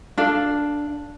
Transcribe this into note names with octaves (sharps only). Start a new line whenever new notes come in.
D4 A4 F5